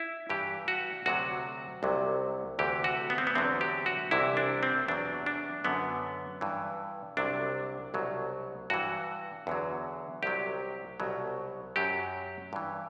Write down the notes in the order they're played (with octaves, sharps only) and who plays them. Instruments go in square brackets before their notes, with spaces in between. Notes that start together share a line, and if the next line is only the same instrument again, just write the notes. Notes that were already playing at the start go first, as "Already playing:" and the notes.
Already playing: [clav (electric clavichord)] E4
G2 E3 G4
F#4
D2 C3 F#3 F#4
C2 C3 F#3
D2 C3 E3 G4
F#4
B3
C4
B3
E2 D3 F#3 C4
G4
F#4
C2 C3 E3 E4
D4
C4
E2 B2 F#3 D4
D4
F#2 D3 F#3 B3
G2 E3
C2 C3 F#3 D4
C2 B2 F#3
G2 E3 F#4
E2 D3 F#3
C2 C3 F#3 G4
C2 B2 F#3
F#2 F#3 G4
G2 E3